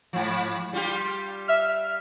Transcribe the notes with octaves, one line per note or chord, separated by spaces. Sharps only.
G#2 F3
G3 F4 G4
E5 F6